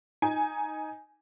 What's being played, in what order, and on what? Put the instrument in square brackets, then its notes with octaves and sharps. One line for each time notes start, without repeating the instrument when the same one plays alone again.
[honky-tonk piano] D#4 G#5